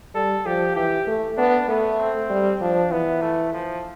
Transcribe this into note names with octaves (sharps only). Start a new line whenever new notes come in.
G3 A4
F3 G4
E3 G4
A3
B3 D4
A3 B3
C4
G3
F3 D4
E3 B3
A3
F3